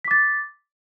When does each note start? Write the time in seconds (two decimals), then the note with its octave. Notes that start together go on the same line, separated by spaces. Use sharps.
0.04 B6
0.08 D6
0.11 A6